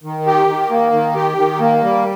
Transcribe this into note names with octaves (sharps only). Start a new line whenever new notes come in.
D#3
G4
D#3
A#3
D#3
G4
D#3
A#3
G3